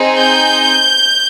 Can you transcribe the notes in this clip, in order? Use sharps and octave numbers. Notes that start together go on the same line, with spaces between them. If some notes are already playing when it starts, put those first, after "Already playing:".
Already playing: C4 D#4 G#4
G6